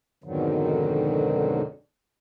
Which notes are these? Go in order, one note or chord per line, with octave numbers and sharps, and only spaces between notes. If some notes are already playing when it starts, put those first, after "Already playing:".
F2 G#2 B2 D3 D#3 F#3